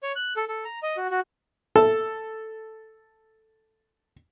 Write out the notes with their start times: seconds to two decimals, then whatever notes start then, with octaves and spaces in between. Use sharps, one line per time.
0.03 C#5
0.16 F#6
0.36 A4
0.48 A4
0.65 A#5
0.83 D#5
0.97 F#4
1.10 F#4
1.76 A4 A5